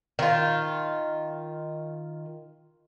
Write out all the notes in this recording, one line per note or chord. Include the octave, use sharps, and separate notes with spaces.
D#3 F4